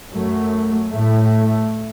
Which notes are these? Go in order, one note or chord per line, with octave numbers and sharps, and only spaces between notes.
F#2 F#3 A3
A2 A3